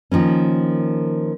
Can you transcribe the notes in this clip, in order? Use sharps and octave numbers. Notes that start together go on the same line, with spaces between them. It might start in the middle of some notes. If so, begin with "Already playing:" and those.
D#3 F3 A#3 C#4